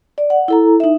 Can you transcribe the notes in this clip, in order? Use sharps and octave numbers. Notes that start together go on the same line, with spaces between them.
D5
F#5
E4 A4 A#5
D#4 E5